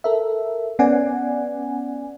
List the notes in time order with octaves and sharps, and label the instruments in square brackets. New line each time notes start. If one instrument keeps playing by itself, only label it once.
[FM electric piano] A4 A#4 E5
B3 C#4 D5 F#5 G#5